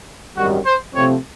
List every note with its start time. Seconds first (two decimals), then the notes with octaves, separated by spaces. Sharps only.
0.37 G#1 F#2 D#3 G3 F#4
0.66 C5
0.95 C3 F3 A3 C4 C#5